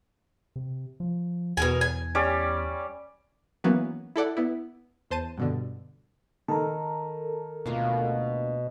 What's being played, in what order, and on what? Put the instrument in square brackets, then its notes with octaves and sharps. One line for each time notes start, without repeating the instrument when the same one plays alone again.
[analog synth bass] C3
F3
[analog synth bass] E2 [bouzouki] B2 A#4 G#5
[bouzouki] G#5
[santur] G3 C#4 D5
[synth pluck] E3 F#3 A#3 B3 C#4
E4 A4 D5 F#5
B3 E4
E2 C5 A5 D#7
G2 B2 D3
[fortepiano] D#3 [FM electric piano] A4 A#4
[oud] D2 A#3 F4 [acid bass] B2